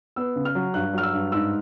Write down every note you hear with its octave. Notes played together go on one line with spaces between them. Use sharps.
B3 E6
C#3
F6
F#3
G2 F#6
F#3 F6
E6
G2
G#2 E6